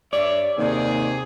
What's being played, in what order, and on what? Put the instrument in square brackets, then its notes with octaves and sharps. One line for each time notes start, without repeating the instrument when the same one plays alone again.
[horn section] G2 C#5 E5 [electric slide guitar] D5
[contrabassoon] D#2 [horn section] C3 G#4